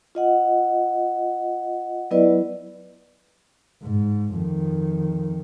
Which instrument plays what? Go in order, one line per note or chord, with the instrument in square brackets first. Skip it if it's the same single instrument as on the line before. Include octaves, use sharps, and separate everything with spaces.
[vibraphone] F4 D#5 F#5
F#3 B3 E4 B4 D5 D#5
[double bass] G#2
F2 D#3